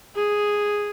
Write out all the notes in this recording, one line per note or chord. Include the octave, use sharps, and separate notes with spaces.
G#4